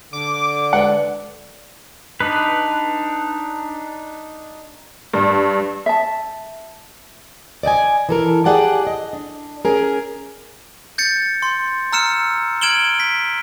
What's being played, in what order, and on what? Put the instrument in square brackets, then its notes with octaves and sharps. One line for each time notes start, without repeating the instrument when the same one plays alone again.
[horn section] D3 [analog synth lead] D6
[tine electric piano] G#3 B4 D5 [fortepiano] F#5
[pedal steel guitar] D4 D#4 B4
[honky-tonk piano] G2
[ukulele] E5 A5
[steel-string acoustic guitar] D5 D#5 G5 G#5
E3 A4 A#4
G4 G#4 D5 F#5 G5 A5
D#5
D4
C#4 G#4 A#4
[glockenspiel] G6 A6 C#7
C6
A#5 E6 F6 C#7 E7
F6 G#6 D7 E7 F#7 G7
B6